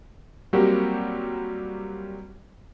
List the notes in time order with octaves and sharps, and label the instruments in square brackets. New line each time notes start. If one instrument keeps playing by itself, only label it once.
[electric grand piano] F#3 G3 A#3 C4 F#4 G4